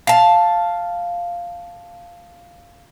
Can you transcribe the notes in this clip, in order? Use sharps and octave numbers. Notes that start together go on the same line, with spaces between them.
F5 A5